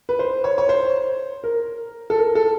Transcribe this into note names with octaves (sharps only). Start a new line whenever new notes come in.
B4
C5
C#5
C#5
C5
A#4
A4
A#4
A4